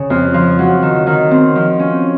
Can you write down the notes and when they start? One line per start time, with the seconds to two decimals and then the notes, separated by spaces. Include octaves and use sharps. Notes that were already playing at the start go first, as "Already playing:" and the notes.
Already playing: C#3
0.10 F2
0.34 F3
0.59 F#3
0.82 D#3
1.07 D#3
1.31 C4
1.56 F3
1.79 C#4